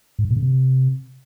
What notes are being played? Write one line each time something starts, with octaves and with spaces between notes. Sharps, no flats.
G#2
G2
B2
C#3
C3